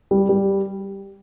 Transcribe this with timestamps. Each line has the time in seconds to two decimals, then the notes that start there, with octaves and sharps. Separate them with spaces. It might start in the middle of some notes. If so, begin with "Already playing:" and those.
0.11 G3
0.29 G3